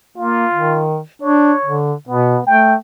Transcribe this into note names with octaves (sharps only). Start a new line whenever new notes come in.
A#3 F4
D#3
D4 C#5
D3
B2 B3
A3 G5